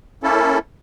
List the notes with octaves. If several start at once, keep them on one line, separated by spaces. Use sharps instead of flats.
A#3 C#4 E4 A4